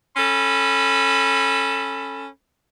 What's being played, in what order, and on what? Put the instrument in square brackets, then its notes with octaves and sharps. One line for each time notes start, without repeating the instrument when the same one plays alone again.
[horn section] C#4 A4 B5